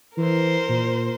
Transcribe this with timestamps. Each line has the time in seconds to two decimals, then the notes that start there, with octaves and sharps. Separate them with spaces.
0.17 E3 A#4 C5
0.69 A#2